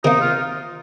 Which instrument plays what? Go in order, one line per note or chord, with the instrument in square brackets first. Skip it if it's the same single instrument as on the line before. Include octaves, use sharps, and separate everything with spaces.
[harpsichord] C3 D#3 A#3 [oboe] D#4
[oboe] F4